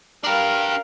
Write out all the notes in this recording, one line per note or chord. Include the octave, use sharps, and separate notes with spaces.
D4 G4 A#4 F5